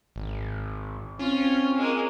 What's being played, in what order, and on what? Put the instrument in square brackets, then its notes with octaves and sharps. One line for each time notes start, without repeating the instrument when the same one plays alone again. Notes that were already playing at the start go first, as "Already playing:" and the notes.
[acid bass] G#1
[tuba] C4 [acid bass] C#4 [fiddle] F4
[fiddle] G#3 A#3